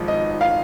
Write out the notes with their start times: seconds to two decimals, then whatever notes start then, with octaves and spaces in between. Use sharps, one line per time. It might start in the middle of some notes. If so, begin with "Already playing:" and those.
Already playing: G#1 G#2 F3
0.08 D#5
0.41 F5